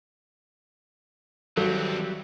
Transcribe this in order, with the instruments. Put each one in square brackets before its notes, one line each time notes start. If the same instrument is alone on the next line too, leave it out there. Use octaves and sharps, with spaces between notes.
[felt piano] G#1 F#4 [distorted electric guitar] E3 C4 [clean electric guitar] F#3 G3 [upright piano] A4